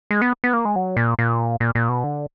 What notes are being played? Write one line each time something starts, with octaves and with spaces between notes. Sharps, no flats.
G#3
B3
B3
A#3
G#3
F#3
A#2
A#2
A#2
A#2
B2
D3